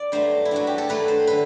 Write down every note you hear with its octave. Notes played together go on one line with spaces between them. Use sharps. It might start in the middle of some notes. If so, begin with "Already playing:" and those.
Already playing: D5
G2 F#3 A3 C5
E4
G2 F#3 A3 F#4
G4
A4
G2 F#3 A3 B4
C5
D3 B4